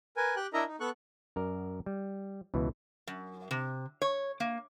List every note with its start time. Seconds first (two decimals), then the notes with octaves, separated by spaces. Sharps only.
0.17 A#4 B4 G#5
0.36 G4 G5 F#6
0.53 D4 E4 A#4 D#5 E5 A#5
0.67 D#4
0.80 B3 A4 C#6 F#6
1.36 F#2 A#4 D5
1.86 G3
2.54 C#2 B2 E3
3.07 F#2
3.51 C3
4.02 C#5
4.40 A#3